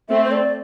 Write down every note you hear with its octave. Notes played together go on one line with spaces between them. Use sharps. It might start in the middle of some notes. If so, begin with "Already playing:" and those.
A3 C4 E5
C5
D5